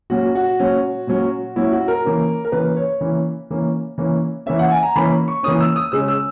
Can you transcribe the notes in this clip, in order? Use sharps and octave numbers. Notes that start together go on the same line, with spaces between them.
A#2 F#3 C#4 F#4
F#4
A#2 F#3 C#4
A#2 F#3 C#4
A#2 F#3 C#4 E4
F#4
A#4
E3 A#3 C#4
A#4
E3 A#3 C#4 B4
C#5
E3 A#3 C#4
E3 A#3 C#4
E3 A#3 C#4
E3 A#3 C#4 E5
F#5
G#5
A#5
E3 A#3 C#4 B5
C#6
E3 A#3 C#4 D#6
E6
D#6
C#3 G#3 C#4 E6
E6